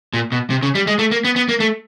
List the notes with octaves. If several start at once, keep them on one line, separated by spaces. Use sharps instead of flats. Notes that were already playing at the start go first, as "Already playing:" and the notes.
A#2
B2
C3
C#3
G3
G#3
A3
A#3
B3
B3
A#3
A3